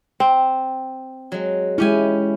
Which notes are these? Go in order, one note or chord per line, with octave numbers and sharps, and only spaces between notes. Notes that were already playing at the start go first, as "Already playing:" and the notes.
C4
F#3 G#3
G#3 C#4 E4 G4 G#5